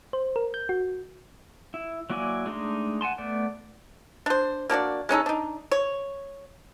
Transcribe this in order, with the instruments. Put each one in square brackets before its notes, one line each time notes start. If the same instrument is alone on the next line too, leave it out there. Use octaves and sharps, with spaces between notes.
[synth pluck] C5
A#4
G6
F#4
[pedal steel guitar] E4
F#3 A#3 E4 D5 G#5
G#3 A3 D4 D#4 C6
F#5 G#5 A5 C6
A3 B3 D5
[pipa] D4 C5
A#3 D4 F#4 D5
G#3 C#4 D#4 A4
D4 D#4
C#5